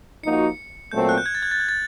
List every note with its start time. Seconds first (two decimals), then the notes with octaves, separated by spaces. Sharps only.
0.23 F3 A#3 D#4 F#4 C#7
0.92 A#2 F#3 A3 C4 G6
1.09 F#6
1.18 G6
1.26 G#6
1.35 A6
1.43 G#6
1.51 A6
1.60 G#6
1.69 A6